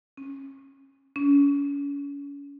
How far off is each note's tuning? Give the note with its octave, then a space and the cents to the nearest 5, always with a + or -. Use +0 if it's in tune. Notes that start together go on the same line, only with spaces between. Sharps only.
C#4 -25
C#4 +35